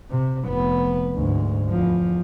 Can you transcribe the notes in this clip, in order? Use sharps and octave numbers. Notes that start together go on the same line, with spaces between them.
C3
F1 B3
D2 G#2
E2 F3